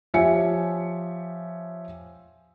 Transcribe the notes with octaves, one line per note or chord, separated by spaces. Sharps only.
F3 G4 C#5 E5 G#5 C#7